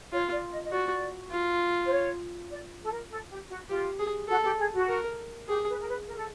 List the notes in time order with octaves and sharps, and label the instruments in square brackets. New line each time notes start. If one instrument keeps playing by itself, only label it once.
[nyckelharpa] F4 [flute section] C#5
[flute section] D5
D#5
D#5
[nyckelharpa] F#4 [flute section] D5
[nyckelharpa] F4
[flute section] C5
C#5
D5
A4
A#4
A4
G4
F#4
[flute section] F4 [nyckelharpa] G4
[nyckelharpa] G#4
[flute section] F#4 [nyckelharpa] A4
[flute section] G4
G#4
F#4
[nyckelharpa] A#4
[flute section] G4 [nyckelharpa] G#4
[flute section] B4
A#4
B4
A#4
A4